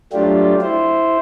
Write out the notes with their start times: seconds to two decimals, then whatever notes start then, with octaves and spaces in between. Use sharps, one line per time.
0.13 F#3 A3 D4 F4 G4
0.61 E4 C5